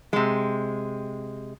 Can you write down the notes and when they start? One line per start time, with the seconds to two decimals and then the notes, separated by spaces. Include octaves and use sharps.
0.13 C3 G#3